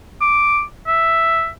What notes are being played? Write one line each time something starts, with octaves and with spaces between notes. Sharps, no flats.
D6
E5